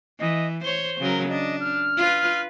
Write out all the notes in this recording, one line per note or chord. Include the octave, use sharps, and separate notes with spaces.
E3 D#5
C5 C#5 G7
C#3 F#3 A#4
D4 D#5
F6
F4 B4